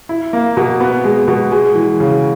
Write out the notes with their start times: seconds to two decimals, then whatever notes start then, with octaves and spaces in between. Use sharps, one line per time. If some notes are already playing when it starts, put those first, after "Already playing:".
0.09 E4
0.33 A#3
0.57 B2
0.80 B3
1.04 G#3
1.28 B2
1.51 G#3
1.75 E3
2.00 C#3